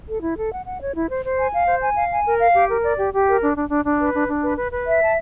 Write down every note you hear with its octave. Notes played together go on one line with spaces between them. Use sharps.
A4
E4
A4
F#5
F#5
C#5
E4
C5
C5
G#5
F5
C5
G#5
F5
G#5
A#4
F5
G4
A#4
D5
G4
G4
A#4
D4
D4
D4
D4
B4
D4
D4
B4
B4
B4
E5
A5